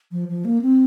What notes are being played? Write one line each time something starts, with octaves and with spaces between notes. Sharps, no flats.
F3
F3
A#3
C4